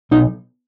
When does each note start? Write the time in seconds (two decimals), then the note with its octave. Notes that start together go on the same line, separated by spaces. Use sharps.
0.11 B1 D#4